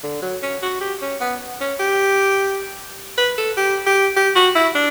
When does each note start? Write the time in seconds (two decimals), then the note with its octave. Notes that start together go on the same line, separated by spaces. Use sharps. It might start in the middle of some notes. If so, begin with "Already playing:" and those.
0.03 D3
0.22 F#3
0.42 C#4
0.62 F#4
0.81 G4
1.02 C#4
1.21 B3
1.61 C#4
1.80 G4
3.18 B4
3.38 A4
3.57 G4
3.86 G4
4.17 G4
4.36 F#4
4.55 E4
4.75 D4